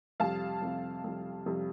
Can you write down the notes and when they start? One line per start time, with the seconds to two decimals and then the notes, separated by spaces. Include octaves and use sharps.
0.20 F2 C3 G3 F5 A5
0.62 F2 C3 G3
1.04 F2 C3 G3
1.46 F2 C3 G3